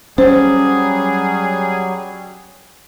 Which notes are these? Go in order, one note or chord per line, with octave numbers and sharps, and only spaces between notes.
F#3 G3 C#4 G#4 C5